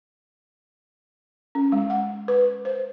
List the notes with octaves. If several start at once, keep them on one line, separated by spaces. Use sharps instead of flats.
C#4
G#3
F#5
B4
C5